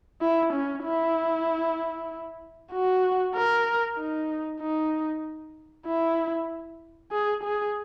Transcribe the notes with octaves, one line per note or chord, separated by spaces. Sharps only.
E4
C#4
E4
F#4
A#4
D#4
D#4
E4
G#4
G#4